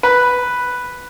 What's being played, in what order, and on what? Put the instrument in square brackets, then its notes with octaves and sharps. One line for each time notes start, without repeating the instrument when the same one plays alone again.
[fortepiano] B4